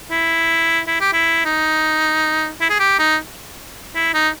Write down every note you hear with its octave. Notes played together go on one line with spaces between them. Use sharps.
E4
E4
G4
E4
D#4
E4
G#4
G4
D#4
E4
D#4